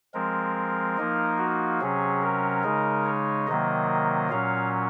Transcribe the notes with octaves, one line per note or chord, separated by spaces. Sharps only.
F3 G#3 C4 A#4
F3 A#3 D#4
F#4
C3 F#3 C#4 G#4
A#4
C#3 G#3 D#4
C#5
C3 D#3 F#3 A#3 D#5
A#2 F#3 C#4 F5